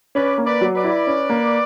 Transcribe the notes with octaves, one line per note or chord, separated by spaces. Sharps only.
C#4 B4 D5
A#3
B4 D5
F#3
B4 D5
E4
C#4
A#3